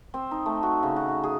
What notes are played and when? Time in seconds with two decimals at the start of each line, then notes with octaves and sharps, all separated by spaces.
0.14 C4
0.31 D#4
0.46 A3
0.63 F#4
0.83 C#3
0.96 F#4
1.08 F#4
1.24 G#4